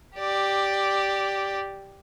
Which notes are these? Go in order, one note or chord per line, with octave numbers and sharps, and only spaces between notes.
G4 D5